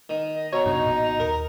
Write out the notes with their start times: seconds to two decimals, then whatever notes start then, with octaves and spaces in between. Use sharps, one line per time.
0.09 D#3
0.34 D#5
0.53 B2 C#5 A#5
0.66 F#2 C3 D4 D#4
0.85 A1 A#2
1.20 D#2 A#4